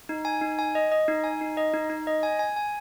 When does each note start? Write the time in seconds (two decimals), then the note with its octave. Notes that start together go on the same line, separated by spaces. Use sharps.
0.09 D#4
0.25 G#5
0.41 D#4
0.59 G#5
0.75 D#5
0.92 D#5
1.08 D#4
1.24 G#5
1.41 D#4
1.57 D#5
1.74 D#4
1.90 D#4
2.07 D#5
2.23 G#5
2.39 G#5
2.56 G#5